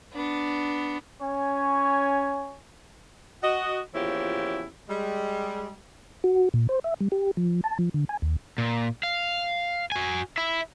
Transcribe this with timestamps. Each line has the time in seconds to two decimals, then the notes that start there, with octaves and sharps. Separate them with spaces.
0.13 B3 D4
1.22 C#4 C#5 G#5
3.43 F#4 D#5
3.94 E2 A#2 F3 C#4 E4 G4
4.89 G3 G#3
6.24 F#4
6.54 A#2
6.69 C5
6.84 E5
7.00 G3
7.12 G4
7.37 F3
7.64 A5
7.79 F3
7.94 D3
8.09 G#5
8.22 D#2
8.58 A#2
9.03 F5
9.92 F#4 G#5
10.38 E4 E5